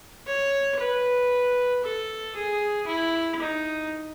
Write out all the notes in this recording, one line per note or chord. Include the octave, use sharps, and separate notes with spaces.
C#5
B4
A4
G#4
E4
D#4